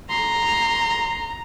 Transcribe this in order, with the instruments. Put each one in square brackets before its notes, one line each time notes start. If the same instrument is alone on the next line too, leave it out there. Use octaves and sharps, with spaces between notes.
[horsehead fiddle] A#5 [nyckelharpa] C6